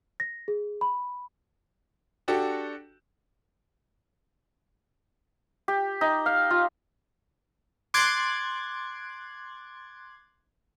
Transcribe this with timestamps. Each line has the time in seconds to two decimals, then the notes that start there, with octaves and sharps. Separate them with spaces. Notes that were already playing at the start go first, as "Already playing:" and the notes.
0.20 A#6
0.48 G#4
0.81 B5
2.28 D4 F#4 G4 A4
5.68 G4
6.01 D#4
6.26 F5
6.50 F4
7.94 C6 D6 F#6 G#6 A6